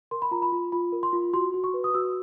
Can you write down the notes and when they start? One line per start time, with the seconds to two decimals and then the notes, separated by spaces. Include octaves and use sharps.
0.11 A#4 C6
0.22 B5
0.31 F4 A#5
0.42 B5
0.52 F4
0.72 F4 B5
0.92 A#4
1.03 C6
1.13 F4
1.33 F#4 C6
1.54 F#4
1.64 C#6
1.74 B4
1.84 D#6
1.94 F#4 E6